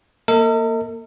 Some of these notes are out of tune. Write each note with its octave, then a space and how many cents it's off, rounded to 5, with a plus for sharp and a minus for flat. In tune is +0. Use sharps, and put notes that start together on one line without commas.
A#3 +0 A#4 -45 D#5 +40